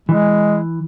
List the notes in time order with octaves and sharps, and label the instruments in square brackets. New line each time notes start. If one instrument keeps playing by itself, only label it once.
[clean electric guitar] E3 [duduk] G#3